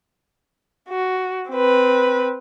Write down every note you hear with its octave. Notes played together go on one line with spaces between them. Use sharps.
F#4
C4 B4